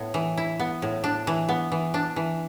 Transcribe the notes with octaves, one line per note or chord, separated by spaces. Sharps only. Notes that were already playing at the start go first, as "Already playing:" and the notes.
Already playing: A2 B3
E3
E4
B3
A2
D4
E3
B3
E3
D4
E3